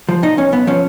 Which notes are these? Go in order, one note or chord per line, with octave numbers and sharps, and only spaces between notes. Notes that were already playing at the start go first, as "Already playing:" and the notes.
F3
A#2 D#4
B1 C#4
B1 B3
F3 C#4